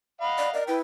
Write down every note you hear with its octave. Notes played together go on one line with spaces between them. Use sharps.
D#5 F5 F#5 B5
D5
A#4 D5 D#5
E4 B4 G5